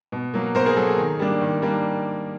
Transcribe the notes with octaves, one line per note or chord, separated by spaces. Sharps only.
B2
F#3 A#3
B2 A#4 C5
G#4 A#4
F#3 A#3 A4
G#4
D#3
G3 A#3 D4
D#3
G3 A#3 D4